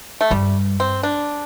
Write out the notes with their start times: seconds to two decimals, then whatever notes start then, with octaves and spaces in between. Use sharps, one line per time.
0.21 A3
0.31 G2 G3
0.80 C4
1.03 D4